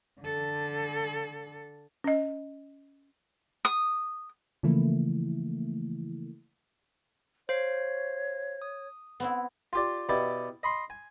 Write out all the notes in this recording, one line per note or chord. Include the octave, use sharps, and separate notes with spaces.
D3 A4
C#4 D#5
D#6
C#3 E3 F3 A3 A#3 E4
C5 C#5 F5 C7
D#6
B3 C4 E4
F4 G4 D5
B2 E4 G4 D5
D#5 B5 C6
G#5